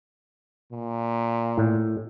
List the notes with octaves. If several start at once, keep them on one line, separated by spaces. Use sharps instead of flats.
A#2
A2